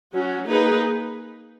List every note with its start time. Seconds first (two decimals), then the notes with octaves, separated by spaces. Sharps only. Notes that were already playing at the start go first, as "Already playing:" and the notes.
0.13 F#3 C#4 F#4
0.47 A#3 D#4 G#4 B4